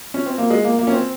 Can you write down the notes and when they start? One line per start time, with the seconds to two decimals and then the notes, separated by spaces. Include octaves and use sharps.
0.14 C#4
0.26 C4
0.38 A#3
0.50 G#3
0.64 A#3
0.79 A#3
0.87 C#4
0.93 C4